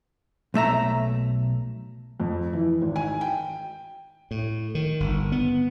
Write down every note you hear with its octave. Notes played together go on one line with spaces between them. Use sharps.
B1 A3 E5 A#5
F2
E3
G#1
G#5
G5
A2
D#3
G1
B3